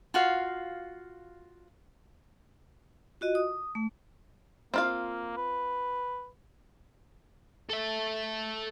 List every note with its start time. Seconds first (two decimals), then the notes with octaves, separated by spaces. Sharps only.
0.14 F4 F#4 F5
3.21 F4 F#4 D#5
3.35 D#6
3.75 A3
4.74 A#3 C4 F4 F5
5.37 B4
7.70 A4 E5